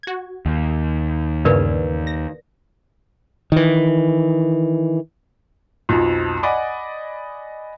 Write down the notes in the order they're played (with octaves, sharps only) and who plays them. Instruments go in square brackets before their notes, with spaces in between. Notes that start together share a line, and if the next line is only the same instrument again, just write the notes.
[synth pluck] F#4 G#6
[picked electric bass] D#2
[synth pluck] E2 G2 C#3 [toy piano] A#4 B4 D5
[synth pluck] A#6
[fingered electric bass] D#3 E3
[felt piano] B1 F2 F3
D5 D#5 F#5 G#5 B5 D6